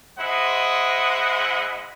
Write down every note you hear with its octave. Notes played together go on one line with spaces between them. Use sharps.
G#3 E4 C5 D#5 F#5